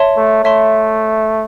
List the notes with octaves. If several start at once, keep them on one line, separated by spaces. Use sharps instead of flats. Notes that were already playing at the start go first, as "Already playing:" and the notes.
Already playing: C#5 E5 A5 C6
A3
A3 C#5 E5 A5 C6